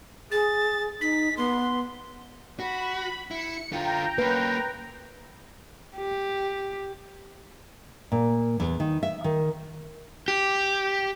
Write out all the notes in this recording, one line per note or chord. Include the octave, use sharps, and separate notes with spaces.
G#4 A6
D#4 B6
B3 C6
F#4 B5
E4 C#7
D3 F4 G5 A#5
A#3 C#4 B4
G4
A#2
E2
D#3
E5
D#3
G4